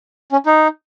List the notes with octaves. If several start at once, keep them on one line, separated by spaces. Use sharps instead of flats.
C#4
D#4